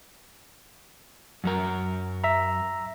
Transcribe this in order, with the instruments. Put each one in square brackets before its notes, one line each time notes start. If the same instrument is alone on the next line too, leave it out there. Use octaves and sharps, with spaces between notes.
[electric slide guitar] F#2 F#3 A#4
[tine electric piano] E5 A#5